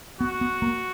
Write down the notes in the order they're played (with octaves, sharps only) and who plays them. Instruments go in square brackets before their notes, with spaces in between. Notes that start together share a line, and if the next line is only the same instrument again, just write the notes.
[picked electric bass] B3 [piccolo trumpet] F#4
[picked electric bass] B3
A#3